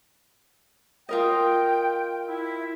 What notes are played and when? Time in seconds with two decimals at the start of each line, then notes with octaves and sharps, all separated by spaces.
1.09 F4 A#4 D#5 G5
2.28 E4